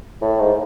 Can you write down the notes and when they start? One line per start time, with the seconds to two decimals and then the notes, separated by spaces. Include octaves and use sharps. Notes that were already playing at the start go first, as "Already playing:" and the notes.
0.22 A2
0.40 G#2